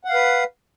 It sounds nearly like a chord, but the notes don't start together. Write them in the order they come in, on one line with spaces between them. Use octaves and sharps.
F#5 F5 B4